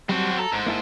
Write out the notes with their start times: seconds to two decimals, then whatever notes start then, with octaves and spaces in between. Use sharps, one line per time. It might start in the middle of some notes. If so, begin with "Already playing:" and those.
0.09 F#3 G3 C4 F#4 A5
0.39 A4 A#5
0.53 A1 G#2
0.66 G1 A#3 E4 A5